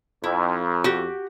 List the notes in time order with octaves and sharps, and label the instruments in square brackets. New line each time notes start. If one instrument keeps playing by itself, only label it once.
[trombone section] F2 [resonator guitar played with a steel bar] E4
[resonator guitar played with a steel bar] F#4 G4